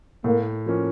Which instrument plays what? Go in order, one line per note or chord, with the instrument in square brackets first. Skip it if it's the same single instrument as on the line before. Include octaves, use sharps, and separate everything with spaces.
[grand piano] A2 [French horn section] A#3
[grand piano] F3 A#3 C#4